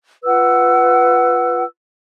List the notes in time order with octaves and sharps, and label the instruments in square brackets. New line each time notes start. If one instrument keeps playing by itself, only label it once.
[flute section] F4 B4 F#5 E6